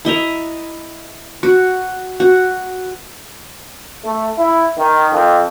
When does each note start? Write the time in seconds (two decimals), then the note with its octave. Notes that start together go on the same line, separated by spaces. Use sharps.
0.05 E4 D#5 E5 A#5
1.43 F#4
2.20 F#4
4.05 A3
4.38 E4
4.78 D#3
5.13 F2